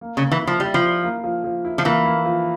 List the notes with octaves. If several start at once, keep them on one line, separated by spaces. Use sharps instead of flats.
A#3
C#3
A#3
E3
E4
F3
G3 E4
F3
E4
A#3
F3
F3
E4
F3
E3 A#3
A#3
F3